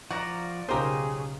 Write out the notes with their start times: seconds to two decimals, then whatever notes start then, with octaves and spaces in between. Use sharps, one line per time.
0.11 F3 F#4 D5 A#5
0.68 B1 C#3 D#4 F4 G4 G#4 A#4 C5